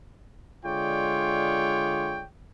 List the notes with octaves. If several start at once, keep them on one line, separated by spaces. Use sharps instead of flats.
D3 G#3 F4 C#5 D5 G5